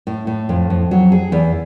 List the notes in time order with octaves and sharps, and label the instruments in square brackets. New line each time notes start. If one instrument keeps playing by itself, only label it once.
[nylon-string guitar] A2
A2
F2
F2
F#3
G#4
E2